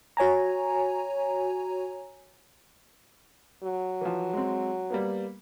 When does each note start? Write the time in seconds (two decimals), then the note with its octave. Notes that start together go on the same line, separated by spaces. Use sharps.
0.17 F#4 C#5 G#5 A#5
3.63 F#3
4.01 E3 F3
4.33 G#3 C4
4.90 G3 A#3 B3